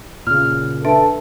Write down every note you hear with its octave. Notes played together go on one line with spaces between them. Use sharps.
A#2 C#3 F6
D4 A4 B4 E5